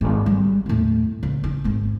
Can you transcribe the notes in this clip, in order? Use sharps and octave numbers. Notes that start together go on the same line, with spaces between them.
G#1
G3
D#2 A2
C#2
D#4
G#1 G#2